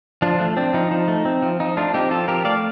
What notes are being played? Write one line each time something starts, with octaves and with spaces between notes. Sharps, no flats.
F3 D4 F4
A3
C4 D4
F3 D#4
F3
A3
C4
F3
F3 D#4
A3 D4 F4
C4 D#4 G4
F3 F4 A4
F3 G4 A#4
A3 D5 F5